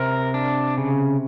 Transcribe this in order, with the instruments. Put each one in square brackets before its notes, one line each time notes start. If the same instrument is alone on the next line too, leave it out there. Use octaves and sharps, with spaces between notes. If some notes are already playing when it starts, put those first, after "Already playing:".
Already playing: [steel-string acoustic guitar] C3 [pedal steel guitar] A#4
[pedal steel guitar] D4
C#3